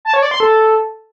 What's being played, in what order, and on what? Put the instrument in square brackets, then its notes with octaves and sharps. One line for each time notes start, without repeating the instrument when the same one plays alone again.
[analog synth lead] A5
C#5
D5
C6
A4